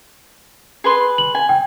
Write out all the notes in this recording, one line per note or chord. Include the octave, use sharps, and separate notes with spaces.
G#4 B4 C6
F#7
G#5
G5